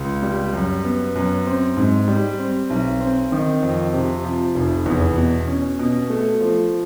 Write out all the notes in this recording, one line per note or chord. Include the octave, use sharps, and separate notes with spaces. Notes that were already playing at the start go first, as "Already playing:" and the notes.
Already playing: C#2
G3
F#2
B3
F#2
C4
G#2
G3
C4
B1
C4
D#3
F2
C3
F3
F1
E2
B2
C#4
B2
A3
F3